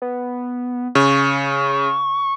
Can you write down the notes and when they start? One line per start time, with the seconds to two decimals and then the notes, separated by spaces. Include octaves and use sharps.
0.02 B3
0.95 C#3 C#6